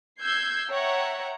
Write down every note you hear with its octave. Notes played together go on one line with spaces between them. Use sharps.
E6 G6 G#6 C7
C#5 E5 F#5 G5 A#5